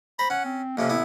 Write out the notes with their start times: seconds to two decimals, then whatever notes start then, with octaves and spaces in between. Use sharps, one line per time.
0.19 C5 A#5 B5
0.30 C#4 F#5
0.45 C4
0.77 F2 C3 A#3 C#4
0.89 A1 B3 E4